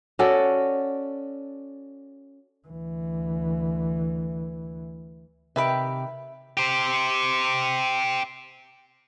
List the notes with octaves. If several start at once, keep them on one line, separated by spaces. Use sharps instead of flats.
C#4 F#4 A4 D5
D2 E3
C3 D#3 G4 B4 E5 G5 B5
G4 C5